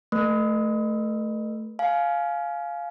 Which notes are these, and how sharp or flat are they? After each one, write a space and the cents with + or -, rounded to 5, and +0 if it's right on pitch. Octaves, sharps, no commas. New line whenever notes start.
A3 +0 B4 -45
F5 +0 G#5 +25